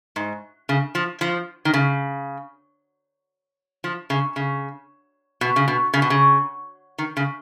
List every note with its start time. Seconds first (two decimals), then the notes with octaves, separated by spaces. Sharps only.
0.16 G#2
0.69 C#3
0.95 F3
1.21 F3
1.65 D#3
1.74 C#3
3.84 F3
4.10 C#3
4.36 C#3
5.41 B2
5.56 C#3
5.68 B2
5.94 C#3
6.02 B2
6.10 C#3
6.98 D#3
7.17 C#3